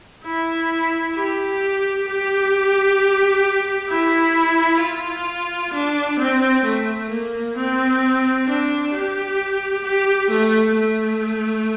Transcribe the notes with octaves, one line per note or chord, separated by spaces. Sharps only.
E4
G4
G4
E4
F4
D4
C4
A3
A#3
C4
D4
G4
G4
A3
A3